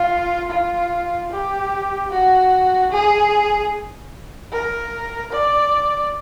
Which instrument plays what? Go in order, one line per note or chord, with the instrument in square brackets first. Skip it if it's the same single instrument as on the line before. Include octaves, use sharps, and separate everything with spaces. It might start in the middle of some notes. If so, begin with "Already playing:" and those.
Already playing: [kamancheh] F4
F4
G4
F#4
G#4
A#4
D5